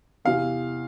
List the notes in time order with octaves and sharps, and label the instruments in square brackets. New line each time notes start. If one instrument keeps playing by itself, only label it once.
[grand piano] E2 C3 E3 [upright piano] F5